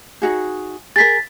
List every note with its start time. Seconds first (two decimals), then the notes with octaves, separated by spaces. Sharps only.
0.22 D#4 F#4 G#4
0.96 G#4 A#4 A6 B6